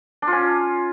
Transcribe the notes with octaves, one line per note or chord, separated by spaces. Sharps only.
D4
F4
C#4